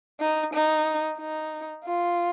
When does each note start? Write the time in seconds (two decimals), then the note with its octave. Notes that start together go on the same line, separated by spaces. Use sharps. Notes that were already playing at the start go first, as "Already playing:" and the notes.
0.20 D#4
0.53 D#4
1.19 D#4
1.85 F4